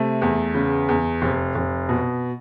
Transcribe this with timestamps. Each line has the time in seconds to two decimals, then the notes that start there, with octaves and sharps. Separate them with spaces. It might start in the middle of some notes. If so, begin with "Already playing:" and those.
Already playing: C3 A3
0.22 E2
0.54 C#3
0.89 E2
1.22 F1
1.55 F1
1.89 B2